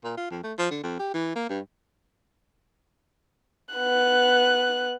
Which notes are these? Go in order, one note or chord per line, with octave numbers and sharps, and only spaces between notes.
A#2
F4
F2
A3
F3
D3
F2
G4
E3
A#3
G2
B3 F#6